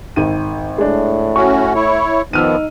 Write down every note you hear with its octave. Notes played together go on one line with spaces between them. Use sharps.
G#1 D#3 D#7
A2 G#3 D4
C#4 F#4 C#6
E4 C#5
D#3 F3 B3 D#4 E6 F6 D#7